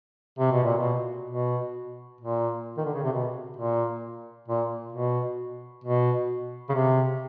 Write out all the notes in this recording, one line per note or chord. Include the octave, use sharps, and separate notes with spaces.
C3
B2
A#2
B2
B2
A#2
D#3
D3
C#3
C3
B2
A#2
A#2
B2
B2
C#3
C3